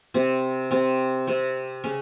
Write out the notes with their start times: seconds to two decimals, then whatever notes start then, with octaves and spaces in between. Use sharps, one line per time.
0.14 C3 C4
0.71 C3 C4
1.27 C3 C4
1.84 C#3 C#4